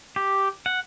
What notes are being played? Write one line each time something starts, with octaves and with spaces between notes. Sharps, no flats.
G4
F#5